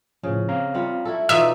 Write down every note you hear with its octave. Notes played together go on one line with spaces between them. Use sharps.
A2 C#3 F3
C4 F5 A#5
G3 F4 F#5
E4 F#4 A4
B2 E3 D#4 F4 D5 E5 D#6